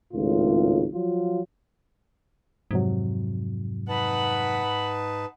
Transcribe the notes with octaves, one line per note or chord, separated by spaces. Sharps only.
G#1 C#2 A2 F4
F3 F#3 F4
F2 G#2 C3 F#3
D#4 B4 F#5 A5 B5